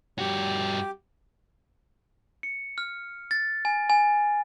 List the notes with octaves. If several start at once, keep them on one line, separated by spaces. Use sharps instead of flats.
G2 F#4 G4
C#7
F6
A6
G#5
G#5